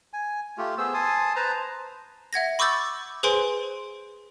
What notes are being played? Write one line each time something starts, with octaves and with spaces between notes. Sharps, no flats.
G#5
A3 F4 G4
B3 G#4 C5 E6
G#5 A5 C6 D#6
B4 C5 A5 A#5
E5 F#5 G#6 A#6
B5 C#6 D6 E6 G6 A6
G#4 B4 C5 G#5 C6 D7